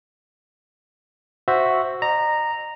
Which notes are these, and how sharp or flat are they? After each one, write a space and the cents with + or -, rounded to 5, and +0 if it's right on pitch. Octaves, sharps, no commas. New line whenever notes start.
F#4 +0 C5 +0 E5 +0
D#5 -45 A#5 -5